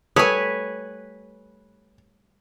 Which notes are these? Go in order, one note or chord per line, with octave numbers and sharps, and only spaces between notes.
G3 A3 B4 C#5 G#5 D#6